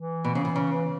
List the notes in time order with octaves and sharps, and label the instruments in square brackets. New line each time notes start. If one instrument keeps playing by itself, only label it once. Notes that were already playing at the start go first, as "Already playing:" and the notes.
Already playing: [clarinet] E3
[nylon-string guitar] B2
C#3
B2
C#3
[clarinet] E3